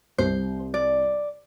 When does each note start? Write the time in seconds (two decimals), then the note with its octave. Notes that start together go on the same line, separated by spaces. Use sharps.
0.18 C2 C3 C5
0.74 D5